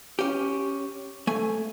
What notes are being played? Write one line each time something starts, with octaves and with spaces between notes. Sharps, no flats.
C#4 G4
A3 G#5